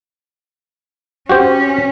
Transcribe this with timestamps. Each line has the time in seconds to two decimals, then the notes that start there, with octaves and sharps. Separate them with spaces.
1.29 C#4 F#4 G4 C5